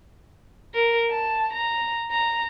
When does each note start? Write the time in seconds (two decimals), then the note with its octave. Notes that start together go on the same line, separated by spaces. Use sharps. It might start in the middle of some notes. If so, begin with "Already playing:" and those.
0.74 A#4
1.11 A5
1.53 A#5
2.11 A#5